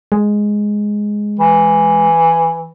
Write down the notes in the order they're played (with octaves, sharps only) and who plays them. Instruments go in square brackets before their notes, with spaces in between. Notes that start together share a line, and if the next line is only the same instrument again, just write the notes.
[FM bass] G#3
[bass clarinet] E3